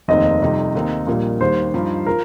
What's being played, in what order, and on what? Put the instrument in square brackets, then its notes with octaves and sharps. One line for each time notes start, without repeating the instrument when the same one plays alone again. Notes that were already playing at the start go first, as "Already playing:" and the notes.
[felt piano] F1 D#2 D#3 C4 D#4 [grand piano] D#5
[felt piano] F2 C3 G3 D#4
D#2 D#3 C4 D#4
A#1 A#2 G3 A#3
[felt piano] D#2 D#3 G3 [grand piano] C5
[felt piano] G2 F3 D#4
[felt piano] F3 [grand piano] A#4